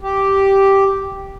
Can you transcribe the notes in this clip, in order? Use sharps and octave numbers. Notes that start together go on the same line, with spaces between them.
G4